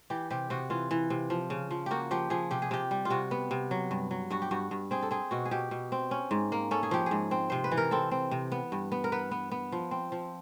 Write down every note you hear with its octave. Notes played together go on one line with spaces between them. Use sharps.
E3 G4
C3 G4
C3 F#4
E3 F4
E3
C3
F3
C#3
F3
A#3 F#4 G4
F3 G4
F3 G#4
C3 G4
G#4
C3 G4
G3
F4
C3 F#4
B3
C3
F#3
G2
F#3
G2 F#4
G4
G2 F#4
G2
C4 G#4
A4
C4 G#4
B2 F#4
G#4
B2 G4
B2
C4
C#4
G#2
A#3
C#4 A4
G#4
F3 G4
G#4
G#2
C4
C3 C5
B4
E3
A#4
C4 A4
C4
C3
B3
G2
B3
A#4
B3 B4
B3
B3
F3
C4
F3